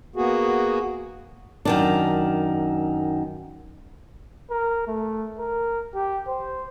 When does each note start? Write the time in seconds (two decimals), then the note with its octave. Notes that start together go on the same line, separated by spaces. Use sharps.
0.16 A#3 B3 F#4 G#4
1.65 F#2 D#3 D4
4.51 A#4
4.87 A3
5.39 A#4
5.95 G4
6.27 C5